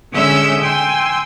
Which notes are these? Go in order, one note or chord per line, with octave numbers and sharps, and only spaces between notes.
D3 G#3 C#4 E5 E6 G6
G5 G#5 C6 E6